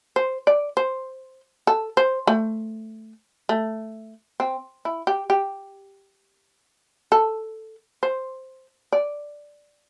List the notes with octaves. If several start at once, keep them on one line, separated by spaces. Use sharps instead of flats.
C5
D5
C5
A4
C5
A3
A3
C4
E4
G4
G4
A4
C5
D5